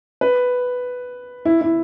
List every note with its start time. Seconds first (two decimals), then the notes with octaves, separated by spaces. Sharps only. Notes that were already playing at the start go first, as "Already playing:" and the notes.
0.21 B4
1.45 E4
1.61 E4